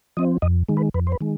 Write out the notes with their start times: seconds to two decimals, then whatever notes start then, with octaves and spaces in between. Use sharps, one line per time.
0.17 F3 C4 D#5
0.42 F2 D#5
0.68 D#3 G#3
0.77 B4
0.94 F2 B4
1.07 C5
1.12 B4
1.21 D#3 G#3